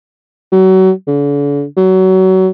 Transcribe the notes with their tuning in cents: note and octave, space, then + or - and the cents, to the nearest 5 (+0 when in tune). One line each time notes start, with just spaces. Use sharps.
F#3 +30
D3 -45
F#3 +25